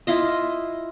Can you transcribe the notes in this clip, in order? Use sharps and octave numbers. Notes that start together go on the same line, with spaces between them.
E4 F4 D#5